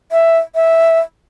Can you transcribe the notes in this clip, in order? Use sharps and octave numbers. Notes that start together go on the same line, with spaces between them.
E5
E5